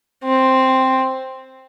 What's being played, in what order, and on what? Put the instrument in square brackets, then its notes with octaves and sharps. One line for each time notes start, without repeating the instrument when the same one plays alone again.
[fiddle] C4